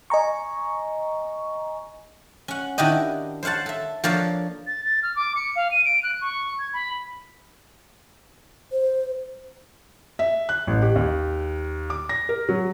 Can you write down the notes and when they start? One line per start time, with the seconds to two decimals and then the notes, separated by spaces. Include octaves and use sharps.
0.10 D#5 G#5 A#5 C#6
2.48 C#4 F#5
2.78 D#3 D4 E4 F#4 G4 D#5
3.43 C5 C#5 F5 F#5 A5
3.66 A4 E5
4.04 F3 A#3 D4 A4 C#5 F5
4.67 A6
4.85 A6
5.03 F6
5.16 D6
5.36 C#7
5.56 F5
5.71 D#7
5.85 D7
6.03 F#6
6.21 C#6
6.59 G#6
6.73 B5
8.72 C5
10.19 E5
10.49 F#6
10.67 A1
10.82 G4
10.96 D#2
11.90 D6
12.09 A#6
12.29 A#4
12.49 F#3